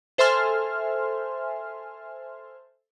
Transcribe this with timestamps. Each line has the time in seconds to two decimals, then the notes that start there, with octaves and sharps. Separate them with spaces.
0.18 A4 C5 E5 G#5 C6 F6